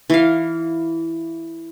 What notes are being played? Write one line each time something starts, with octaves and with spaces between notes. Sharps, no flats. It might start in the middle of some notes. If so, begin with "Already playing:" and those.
E3 F5